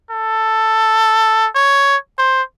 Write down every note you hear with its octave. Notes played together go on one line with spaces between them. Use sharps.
A4
C#5
C5